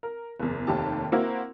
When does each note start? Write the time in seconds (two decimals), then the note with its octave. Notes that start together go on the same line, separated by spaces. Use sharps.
0.03 A#4
0.40 F#1 E2
0.67 F1 D#2 D#3 G4 A5
1.12 A#3 C4 E4 F#4 A#4